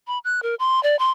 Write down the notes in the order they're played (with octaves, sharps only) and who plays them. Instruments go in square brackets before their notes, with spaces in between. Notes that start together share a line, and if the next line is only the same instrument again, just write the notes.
[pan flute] B5
F#6
A#4
C6
D5
C6